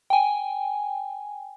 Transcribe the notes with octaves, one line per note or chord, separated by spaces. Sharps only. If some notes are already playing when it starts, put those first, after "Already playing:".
G5 G#5